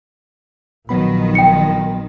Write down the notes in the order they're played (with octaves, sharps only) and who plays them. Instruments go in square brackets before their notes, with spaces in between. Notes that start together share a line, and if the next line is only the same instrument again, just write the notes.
[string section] A#1 D#3 [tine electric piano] F#3 B3 B5
[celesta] G5 C#7